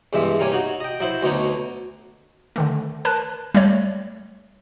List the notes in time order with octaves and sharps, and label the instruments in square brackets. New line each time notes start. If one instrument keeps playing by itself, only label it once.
[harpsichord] E2 G2 G#3 E5
G3 A#3 C#4 C#5 G#5
D#4 F#4
D#5 G5
F#3 E4 C5
D2 B2 D#4 C#5
[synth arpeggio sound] D3 D#3 A3
A#4 B4 A5 F#6
G3 A3 C#5